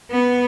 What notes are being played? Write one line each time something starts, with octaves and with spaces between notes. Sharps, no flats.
B3